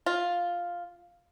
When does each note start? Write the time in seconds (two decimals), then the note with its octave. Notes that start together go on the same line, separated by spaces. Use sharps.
0.06 F4